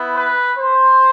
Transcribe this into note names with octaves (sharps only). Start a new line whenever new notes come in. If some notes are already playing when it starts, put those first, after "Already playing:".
Already playing: B3 E4
B4
C5